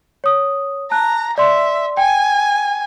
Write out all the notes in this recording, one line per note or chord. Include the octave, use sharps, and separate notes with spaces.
C#5 D#6
A5 A#5 F#6
D5 E5 C6
G5 G#5